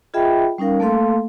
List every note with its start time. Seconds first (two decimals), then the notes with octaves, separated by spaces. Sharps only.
0.14 F4 G#4 D#5 E5 G5 B5
0.58 G3 C#4 D#4 A#4 F5
0.80 A3 A#3 A4 F5 C6